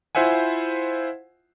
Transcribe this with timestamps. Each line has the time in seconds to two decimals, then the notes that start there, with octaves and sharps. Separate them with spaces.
0.15 E4 F4 C5 E5 F#5 G#5